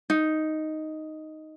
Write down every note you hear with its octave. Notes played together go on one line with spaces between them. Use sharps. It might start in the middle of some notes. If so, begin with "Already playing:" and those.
D#4